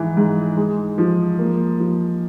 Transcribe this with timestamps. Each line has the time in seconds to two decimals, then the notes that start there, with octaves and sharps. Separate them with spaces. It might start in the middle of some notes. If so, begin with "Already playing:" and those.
Already playing: G#2 E3 F3
0.17 G#2
0.57 G#3
0.98 F3
1.39 A#3
1.79 F3